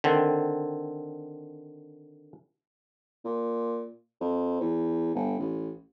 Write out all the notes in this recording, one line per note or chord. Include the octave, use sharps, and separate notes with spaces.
D3 D#3 C4
A#2
F2
E2
G1
A1